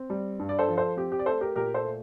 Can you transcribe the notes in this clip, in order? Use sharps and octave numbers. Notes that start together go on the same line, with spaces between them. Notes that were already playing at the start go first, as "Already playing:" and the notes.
Already playing: C4
G3
G2
D5
A4 C5
F3
A4 C5
C4 G4
G4
D5
A3 A4 C5
G4 A#4
A#2 G4 A#4
A4 C5
A3